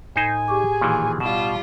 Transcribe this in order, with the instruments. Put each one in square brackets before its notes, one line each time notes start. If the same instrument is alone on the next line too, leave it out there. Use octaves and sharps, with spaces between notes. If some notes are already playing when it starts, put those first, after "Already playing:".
[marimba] A2 B5 G#6 [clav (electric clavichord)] D#4 C5 [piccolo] G#5
[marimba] G4 C#6 D6 [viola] G#4
[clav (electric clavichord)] A#2 D#3 E3
[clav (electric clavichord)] B2 [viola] G3 F4 [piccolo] E7